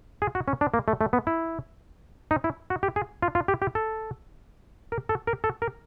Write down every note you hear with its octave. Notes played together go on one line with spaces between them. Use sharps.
G#4
F#4
C#4
D4
A#3
A3
A3
B3
E4
D#4
E4
F#4
G4
G#4
F4
F4
G4
G4
A4
A#4
A4
A#4
A4
A#4